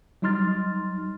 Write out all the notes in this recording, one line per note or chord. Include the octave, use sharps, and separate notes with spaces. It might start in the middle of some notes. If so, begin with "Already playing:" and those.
F#3 G3 D#4 C6 F6 A6